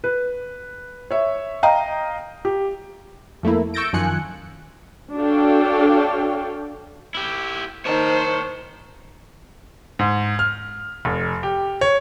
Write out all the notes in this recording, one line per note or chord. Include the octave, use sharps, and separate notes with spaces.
B4
C#5 E5
D#5 F5 G5 A#5
G4
F2 A3 A#3 E4
C#6 E6 G6 A6 A#6 D7
F#2 D#3 F3 G#5 F#6 C#7
D4 F#4 A4 C#5 F5 G5
E4 G4
D#3 C5 C#5 A5
G#2
F6
F1
G4
C#5